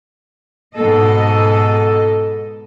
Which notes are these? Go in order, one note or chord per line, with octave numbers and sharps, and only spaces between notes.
G#2 B2 A4 D#5